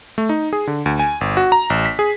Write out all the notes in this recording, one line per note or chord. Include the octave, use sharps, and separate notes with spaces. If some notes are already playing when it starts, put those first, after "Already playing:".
A3
D#4
G#4
D3
D2
G#5
G1
F#4
A#5
A1
B6
G#4